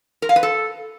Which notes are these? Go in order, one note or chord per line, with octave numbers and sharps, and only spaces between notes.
A#4
F5
B4
A4